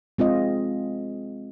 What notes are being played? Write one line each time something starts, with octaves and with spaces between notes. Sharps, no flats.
G#3 C4 F4 D#5